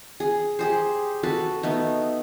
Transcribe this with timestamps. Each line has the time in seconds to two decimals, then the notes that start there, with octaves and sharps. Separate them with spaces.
0.20 G#4
0.59 G4 G#4 C5
1.23 F#4 A4 B4
1.63 A3 B3 D#4